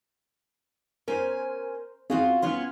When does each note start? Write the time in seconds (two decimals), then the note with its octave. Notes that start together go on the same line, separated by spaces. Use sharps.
1.08 C#4 A#4 C5 G#5
2.10 C4 C#4 F4 F#4 G#4 F5
2.42 B3 C#4 F4 C#5 C6